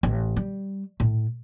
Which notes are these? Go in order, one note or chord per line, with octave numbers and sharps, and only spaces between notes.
A1
G3
A2